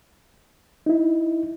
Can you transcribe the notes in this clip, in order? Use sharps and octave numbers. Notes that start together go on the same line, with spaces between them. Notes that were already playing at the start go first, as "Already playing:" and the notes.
D#4 E4